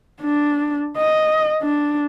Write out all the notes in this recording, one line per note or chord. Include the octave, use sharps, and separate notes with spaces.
D4
D#5
D4